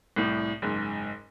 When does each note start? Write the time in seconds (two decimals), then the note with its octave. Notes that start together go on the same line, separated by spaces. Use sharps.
0.16 C2 A2
0.62 F#1 G#2